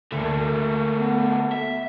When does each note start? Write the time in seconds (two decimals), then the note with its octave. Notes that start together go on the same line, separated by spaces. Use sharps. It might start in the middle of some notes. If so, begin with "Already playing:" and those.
0.12 D2 A3 A#3
0.97 B3
1.52 E5